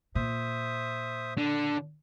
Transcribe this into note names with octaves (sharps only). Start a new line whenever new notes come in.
A#2 C5 E5 D#6
D3